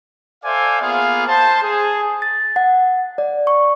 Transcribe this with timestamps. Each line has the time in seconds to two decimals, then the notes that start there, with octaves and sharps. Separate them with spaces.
0.43 A4 C5 D5 E5 F5 G#5
0.80 A#3 B3 F4 G#4 F5
1.27 C5 A5
1.62 G#4
2.22 A6
2.56 F#5
3.18 D5
3.47 C#6